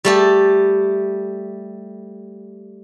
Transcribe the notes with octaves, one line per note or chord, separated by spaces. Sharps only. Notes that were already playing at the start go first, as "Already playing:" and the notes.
G3 A3 G4